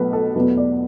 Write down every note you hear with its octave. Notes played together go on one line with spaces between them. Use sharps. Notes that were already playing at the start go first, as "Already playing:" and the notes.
Already playing: B1 B2 F#3 A3 B4
A4
E2 B2 F#3 A3 B4
D5